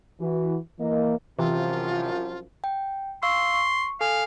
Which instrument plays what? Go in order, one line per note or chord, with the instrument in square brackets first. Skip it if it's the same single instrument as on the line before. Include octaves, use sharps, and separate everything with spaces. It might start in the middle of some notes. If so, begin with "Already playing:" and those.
[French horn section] E3 F#4
E3 A#3 D#5
[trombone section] C2 F#2 F3 [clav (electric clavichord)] C3 [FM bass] E3 [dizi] F4
[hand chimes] G5
[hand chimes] F5 C#6 E6 [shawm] C6
[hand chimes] C#6
[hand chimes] A4 G#5 [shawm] F5